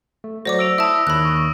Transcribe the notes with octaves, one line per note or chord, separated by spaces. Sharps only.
A3
F#3 A3 F#4 C5 D5 D6 A#6
E6 D7 F7
E4 E5 A5 D#6 E6
D#2 D#3 C#5 B5 F#6
C#6